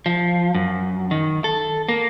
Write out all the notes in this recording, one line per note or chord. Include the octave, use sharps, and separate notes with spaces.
F3
F#2
D#3
A4
A#3